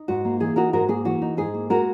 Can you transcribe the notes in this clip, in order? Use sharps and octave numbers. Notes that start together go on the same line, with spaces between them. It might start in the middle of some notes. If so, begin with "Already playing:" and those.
Already playing: D#4
G#2 F#4
A#3
E3 G#4
D#4 F#4 A#4
G#2 F#4 A#4
A#3 G#4
E3 F#4
D#4
G#2 G#4
A#3
G#3 F#4 A#4